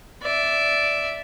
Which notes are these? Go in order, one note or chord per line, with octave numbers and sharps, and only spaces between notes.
D5 E5